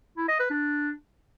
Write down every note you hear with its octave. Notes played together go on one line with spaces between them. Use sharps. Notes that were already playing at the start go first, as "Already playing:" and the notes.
E4
D#5
B4
D4